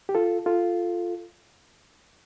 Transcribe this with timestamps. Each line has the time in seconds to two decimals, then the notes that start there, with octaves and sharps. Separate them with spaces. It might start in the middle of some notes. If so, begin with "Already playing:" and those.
0.09 G4
0.15 F4 A4
0.46 F4 A4